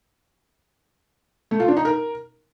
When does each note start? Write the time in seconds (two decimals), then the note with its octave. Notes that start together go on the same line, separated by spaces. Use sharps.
1.51 A3
1.60 F4
1.68 D4
1.77 D#4
1.85 A#4